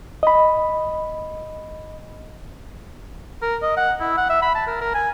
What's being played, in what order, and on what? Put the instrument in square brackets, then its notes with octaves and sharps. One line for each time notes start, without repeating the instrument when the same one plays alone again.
[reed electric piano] D#5 B5
[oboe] A#4
D#5
F#5
E4
F#5
E5
B5
A5
A#4
A#4
G#5